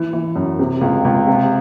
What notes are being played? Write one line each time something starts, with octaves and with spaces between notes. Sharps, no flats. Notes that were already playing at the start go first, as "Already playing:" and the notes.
Already playing: E3
E3
F#2
C3
C#2
C#2
C3